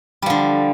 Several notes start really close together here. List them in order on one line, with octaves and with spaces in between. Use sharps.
G3 F3 D3